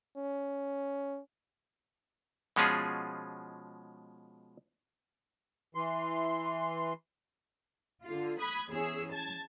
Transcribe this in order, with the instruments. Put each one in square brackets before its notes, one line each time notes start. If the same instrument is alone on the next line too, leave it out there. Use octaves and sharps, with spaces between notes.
[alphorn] C#4
[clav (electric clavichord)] B2 F3 G#3 C#4 F4 G#4
[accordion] E3 C6
[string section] D3 F4
B5 D#6 F#6 G#6
E2 C#4 G#4 E6
A5 G#6 A6